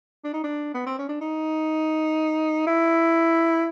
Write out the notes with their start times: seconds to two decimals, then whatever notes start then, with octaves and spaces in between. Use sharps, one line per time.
0.24 D4
0.34 D#4
0.44 D4
0.74 B3
0.86 C4
0.99 C#4
1.09 D4
1.21 D#4
2.67 E4